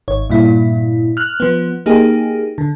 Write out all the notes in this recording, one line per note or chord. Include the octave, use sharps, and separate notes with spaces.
G#1 C#5
G2 A#2 E4
F6 F#6
F3 B3
A#3 D#4 G4 G#4
D3